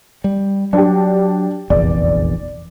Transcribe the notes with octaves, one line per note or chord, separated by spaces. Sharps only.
G3
F#3 D4 G4
F1 A#1 E2 D5